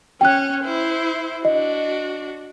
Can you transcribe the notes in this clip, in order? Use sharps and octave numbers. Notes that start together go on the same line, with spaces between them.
C#4 C#5 G5 F#6
E4 C5
D4 F#4 D#5